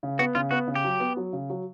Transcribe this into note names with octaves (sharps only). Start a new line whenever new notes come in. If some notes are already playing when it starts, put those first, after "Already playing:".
C#3
B3 F#4
C#3 F4
B3 F#4
C#3
G4
F#3
B3
F#3
C#3
F#3